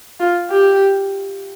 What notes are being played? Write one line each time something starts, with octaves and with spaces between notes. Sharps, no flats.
F4
G4